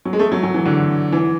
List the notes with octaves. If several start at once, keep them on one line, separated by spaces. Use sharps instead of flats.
F#3
G#3
A3
F#3
F#3
E3
D3
E3